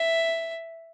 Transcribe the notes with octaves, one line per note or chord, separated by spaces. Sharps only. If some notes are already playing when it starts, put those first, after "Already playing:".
Already playing: E5